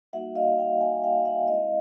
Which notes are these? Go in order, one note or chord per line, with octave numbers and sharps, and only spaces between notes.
G3 A#3 D#4 F#4 E5 F#5
D#5 F5
F5 G5
F#5 G#5
F5 G5
E5 F#5
G#3 C4 E4 D#5 F5